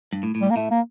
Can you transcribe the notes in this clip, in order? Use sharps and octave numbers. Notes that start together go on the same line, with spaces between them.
G2
A2
A2
G3
A#3
A2 A3
A#3